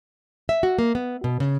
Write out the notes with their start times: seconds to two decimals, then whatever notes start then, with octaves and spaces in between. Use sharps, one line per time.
0.49 E5
0.63 F#4
0.79 A#3
0.95 B3
1.24 B2
1.40 C#3